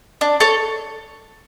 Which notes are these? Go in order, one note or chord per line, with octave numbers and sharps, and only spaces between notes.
D4
A4 C#5